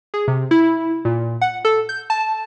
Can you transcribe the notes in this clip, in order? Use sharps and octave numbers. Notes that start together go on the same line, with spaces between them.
G#4
C3
E4
A#2
F#5
A4
G6
A5